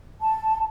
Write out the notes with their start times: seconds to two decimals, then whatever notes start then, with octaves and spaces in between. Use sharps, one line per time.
0.21 A5